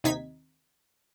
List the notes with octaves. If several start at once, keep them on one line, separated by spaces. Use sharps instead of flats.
D#2 C3 D#4 G#6 B6